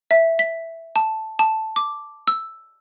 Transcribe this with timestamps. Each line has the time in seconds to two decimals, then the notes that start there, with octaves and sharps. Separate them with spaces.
0.11 E5
0.39 B6
0.96 A5
1.39 A5
1.76 D6
2.27 E6